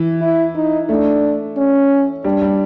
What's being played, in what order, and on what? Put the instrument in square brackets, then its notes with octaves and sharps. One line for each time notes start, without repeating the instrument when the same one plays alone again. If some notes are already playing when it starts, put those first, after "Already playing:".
Already playing: [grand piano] E3
[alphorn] E4
D#4
[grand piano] A3 [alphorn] D4
[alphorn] C#4
[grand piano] G3 [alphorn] D4
[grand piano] G3